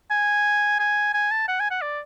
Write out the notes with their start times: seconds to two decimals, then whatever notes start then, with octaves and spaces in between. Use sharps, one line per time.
0.11 G#5
0.80 G#5
1.14 G#5
1.31 A5
1.48 F#5
1.60 G#5
1.71 F#5
1.82 D5